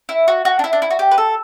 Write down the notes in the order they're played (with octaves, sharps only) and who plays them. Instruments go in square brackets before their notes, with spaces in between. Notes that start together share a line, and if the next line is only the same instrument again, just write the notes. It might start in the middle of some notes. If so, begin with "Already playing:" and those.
[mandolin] E4
F#4
F#4
D4
E4
D4
E4
F#4
G4
B4
A4